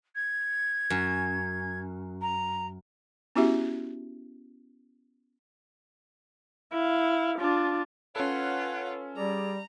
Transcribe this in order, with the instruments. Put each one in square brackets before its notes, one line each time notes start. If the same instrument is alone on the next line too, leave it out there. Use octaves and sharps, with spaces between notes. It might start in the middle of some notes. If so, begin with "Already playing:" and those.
[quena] G#6
[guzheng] F#2
[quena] A#5
[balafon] B3 C#4 E4 F#4 G4 E5
[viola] E4 F5
D4 F4
[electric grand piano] C#4 A4 [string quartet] F4 B4 [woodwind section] C#5 F#5
[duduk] G3 [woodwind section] G#4 D5 [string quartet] A#5